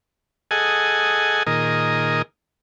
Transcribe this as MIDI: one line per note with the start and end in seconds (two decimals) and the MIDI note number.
0.51 1.43 68
0.51 1.43 69
0.51 1.43 75
0.51 1.43 78
0.51 1.43 80
1.47 2.22 46
1.47 2.22 51
1.47 2.22 68
1.47 2.22 70
1.47 2.22 75